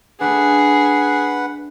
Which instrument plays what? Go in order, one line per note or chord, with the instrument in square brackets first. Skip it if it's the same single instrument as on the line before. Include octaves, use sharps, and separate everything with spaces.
[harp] A3 D4 [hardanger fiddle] G#4 [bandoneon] B4 F#5